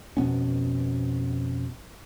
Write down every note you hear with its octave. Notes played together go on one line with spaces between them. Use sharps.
F2 B2 B3 C#4